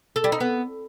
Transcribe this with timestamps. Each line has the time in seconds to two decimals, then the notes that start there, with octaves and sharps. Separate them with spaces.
0.16 A4
0.24 G3
0.32 D#4
0.40 B3